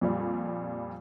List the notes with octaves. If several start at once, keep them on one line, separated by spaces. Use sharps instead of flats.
F2 A#2 G3